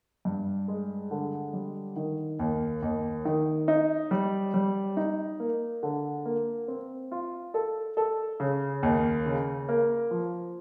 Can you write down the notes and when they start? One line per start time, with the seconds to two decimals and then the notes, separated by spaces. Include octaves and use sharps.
0.25 G2
0.68 G#3
1.11 D3
1.53 G3
1.96 D#3
2.39 D#2
2.82 D#2
3.25 D#3
3.68 D#4
4.11 G3
4.54 G3
4.97 D#4
5.40 A#3
5.83 D3
6.26 A#3
6.68 C4
7.12 F4
7.54 A4
7.97 A4
8.40 C#3
8.83 D#2
9.26 C#3
9.69 A#3
10.11 F3